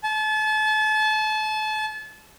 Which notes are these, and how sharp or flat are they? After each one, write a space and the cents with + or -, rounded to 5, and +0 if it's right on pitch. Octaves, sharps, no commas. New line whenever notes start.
A5 -35